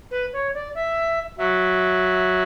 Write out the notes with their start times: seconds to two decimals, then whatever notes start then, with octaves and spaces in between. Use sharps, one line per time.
0.11 B4
0.33 C#5
0.54 D5
0.75 E5
1.38 F#3 E5